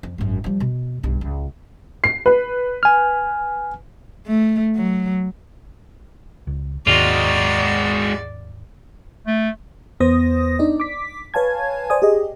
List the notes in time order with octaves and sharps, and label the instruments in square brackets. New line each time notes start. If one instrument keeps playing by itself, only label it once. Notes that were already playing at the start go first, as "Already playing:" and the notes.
[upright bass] F2
G#1 F#2
F3 G3
B2
B1 G2
C#2
[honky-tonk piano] C7
B4
[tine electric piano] G#5 F6
[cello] A3
F#3
[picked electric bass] C#2
[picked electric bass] D#2 G#2 D#3 [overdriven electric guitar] G#3 F#4 [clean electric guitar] F4 [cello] D5
[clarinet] A3
[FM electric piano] E2 B3 C5 D#6 A#6
D4 D#4 D5
D6 B6
B4 C#5 F5 G#5 A5 G#6
C5 D5 G#5 D#6
G4 G#4 D#5